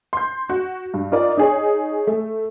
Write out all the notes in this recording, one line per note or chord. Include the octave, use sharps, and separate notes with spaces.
C6 G6
F#4
G2
D#4 F4 A#4 D5 D#5
D#4 G#4 C#5
A3